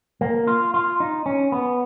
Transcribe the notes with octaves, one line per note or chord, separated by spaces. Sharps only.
A#3
F4
F4
D#4
C#4
B3